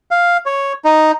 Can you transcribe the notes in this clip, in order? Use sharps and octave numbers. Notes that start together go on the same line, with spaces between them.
F5
C#5
D#4